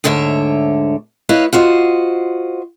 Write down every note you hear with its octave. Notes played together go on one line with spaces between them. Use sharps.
D2 G#2 D3 C#5 E5
E4 B4 C#5 D#5 F5
F4 F#4 C5 D#5